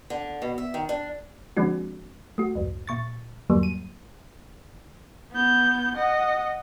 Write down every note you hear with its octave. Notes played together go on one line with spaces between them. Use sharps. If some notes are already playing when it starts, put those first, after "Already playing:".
D3
B2
E5
D#3
D4
D3 F3 G#3 C4 D4 F#4
A3 F#4
C2 F2 G#2
A#2 C#6 A6
E2 G#2 D3 F#3 G3 A#3
D#7
B3 G6
D#5 F#5